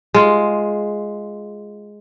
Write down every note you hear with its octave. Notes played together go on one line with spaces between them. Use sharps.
G#3 F4